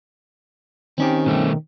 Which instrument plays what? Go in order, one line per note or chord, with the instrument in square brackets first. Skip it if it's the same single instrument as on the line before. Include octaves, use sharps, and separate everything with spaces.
[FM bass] D#3 [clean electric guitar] C4 C#4 G4
[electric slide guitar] B2 G3 A3